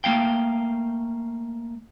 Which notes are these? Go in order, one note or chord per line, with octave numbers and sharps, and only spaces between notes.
A3 A#3 F5 G5